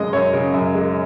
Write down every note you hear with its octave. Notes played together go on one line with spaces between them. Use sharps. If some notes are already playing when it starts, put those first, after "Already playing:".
Already playing: F#2 C#3 G#3 D#5
F#2 C#5
C#3
F#2
G#3